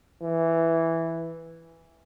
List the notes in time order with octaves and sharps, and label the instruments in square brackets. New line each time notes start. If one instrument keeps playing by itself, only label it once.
[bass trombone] E3